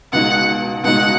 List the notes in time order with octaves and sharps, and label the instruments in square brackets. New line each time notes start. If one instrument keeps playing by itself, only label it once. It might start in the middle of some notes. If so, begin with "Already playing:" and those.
[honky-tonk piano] C#2 B2 G#3 D#4 [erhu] F#5
[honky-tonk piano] C#2 B2 G#3 D#4 [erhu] F#5